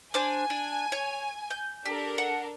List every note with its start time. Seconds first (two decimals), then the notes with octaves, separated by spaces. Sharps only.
0.14 D4 C5 G#5 D6
0.50 D4
0.92 C#5
1.50 G6
1.86 D4 G4 A4 A#4
2.18 F#5